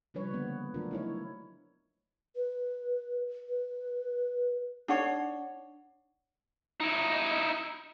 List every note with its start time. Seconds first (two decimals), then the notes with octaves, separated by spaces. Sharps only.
0.14 C#3 F3 G3 D4 B4 C#5
0.31 D3 A#3 B3
0.74 F3 F#3 A3 D4 F4 A#4
0.91 D#4 E4 C#5
2.36 B4
3.49 B4
4.88 D4 D#4 C#5 F#5 C#6
6.80 D#4 E4